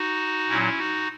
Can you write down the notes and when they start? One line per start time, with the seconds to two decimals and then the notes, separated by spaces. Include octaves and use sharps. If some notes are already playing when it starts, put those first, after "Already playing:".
Already playing: D#4 F#4
0.49 A#2 F#3 C#4 E4
0.77 D#4 F#4